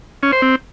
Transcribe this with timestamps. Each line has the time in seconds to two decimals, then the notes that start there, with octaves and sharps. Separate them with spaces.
0.23 C#4
0.32 C5
0.42 C4